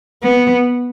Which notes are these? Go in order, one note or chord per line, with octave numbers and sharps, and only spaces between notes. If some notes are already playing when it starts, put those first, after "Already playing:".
B3